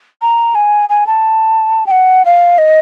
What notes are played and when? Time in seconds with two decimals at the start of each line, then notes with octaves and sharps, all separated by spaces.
0.22 A#5
0.55 G#5
0.89 G#5
1.07 A5
1.86 G5
1.91 F#5
2.25 F5
2.58 D#5